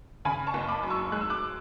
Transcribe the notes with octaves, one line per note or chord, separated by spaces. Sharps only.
C#3 G#5 B5
A5 C#6
F#1
B5 D6
F#2
C#6 E6
G#3 F#6
E6
D6 F#6